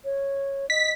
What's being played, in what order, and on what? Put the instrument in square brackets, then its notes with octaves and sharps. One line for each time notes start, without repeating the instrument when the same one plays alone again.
[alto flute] C#5
[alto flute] D#5 [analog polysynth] B6